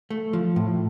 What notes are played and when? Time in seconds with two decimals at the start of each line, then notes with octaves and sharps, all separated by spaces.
0.10 A3
0.33 F3
0.56 A2